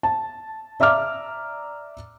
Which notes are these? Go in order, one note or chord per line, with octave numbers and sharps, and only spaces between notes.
A5
D5 E5 A#5 D6 F6